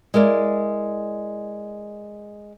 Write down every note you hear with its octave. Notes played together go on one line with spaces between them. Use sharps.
G#3 E4 A#4 D5